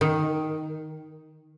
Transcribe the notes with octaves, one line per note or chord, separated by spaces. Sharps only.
D#3